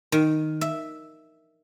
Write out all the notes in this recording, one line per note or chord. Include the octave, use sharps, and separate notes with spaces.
D#3
E5